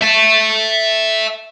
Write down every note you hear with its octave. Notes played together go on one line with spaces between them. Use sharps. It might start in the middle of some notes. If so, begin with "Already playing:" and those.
E5 A5